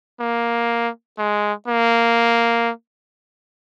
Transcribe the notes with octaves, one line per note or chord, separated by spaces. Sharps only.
A#3
G#3
A#3